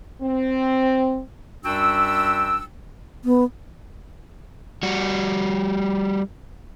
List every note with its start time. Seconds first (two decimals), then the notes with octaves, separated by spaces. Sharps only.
0.22 C4
1.65 F#2 G3 D4 F#4 G5 E6
3.25 B3
4.83 G3 F#4